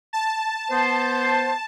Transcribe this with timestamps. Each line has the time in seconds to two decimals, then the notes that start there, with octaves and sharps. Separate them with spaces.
0.13 A5
0.71 B3 C5